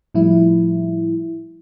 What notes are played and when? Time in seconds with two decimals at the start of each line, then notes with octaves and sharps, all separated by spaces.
0.14 A2 F3 G3 E4